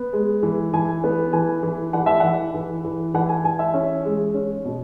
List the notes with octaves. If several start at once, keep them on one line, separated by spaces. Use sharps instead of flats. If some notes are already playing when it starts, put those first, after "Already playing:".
Already playing: B3
G#3
E3
E3 G#5
B3
E3 G#5
E3
E3 F#5
E5
E3 F#5
E3
E3
E3 F#5
G#5
E3 G#5
E5
C#4
G#3
C#4
B2